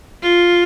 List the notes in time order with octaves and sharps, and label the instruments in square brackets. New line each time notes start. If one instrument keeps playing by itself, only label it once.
[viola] F4